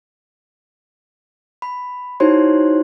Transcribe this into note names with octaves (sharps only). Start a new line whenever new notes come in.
B5
D#4 E4 F#4 C5 C#5 C6